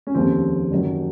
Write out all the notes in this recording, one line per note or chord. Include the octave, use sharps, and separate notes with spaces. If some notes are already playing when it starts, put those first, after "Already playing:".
C#4
F1 D#2 C#3 C4
F#1 F#2 D#3 F#3